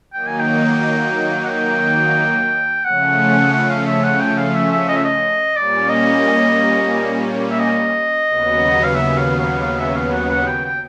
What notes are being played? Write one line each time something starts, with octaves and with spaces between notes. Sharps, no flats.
D#3 F#3 A#3 D#4 G5
G#5
G5
F#5
G5
C#3 F3 A3 C#4 F#5
F#5
F5
E5
F#5
G5
F5
E5
E5
D#5
E5
D#5
A#2 G3 A#3 C#4 D5
D#5
E5
D#5
D#2 C#3 F#3 B3
F5
E5
F5
F5
F5
E5
F5
F#5
F#5
G5
G5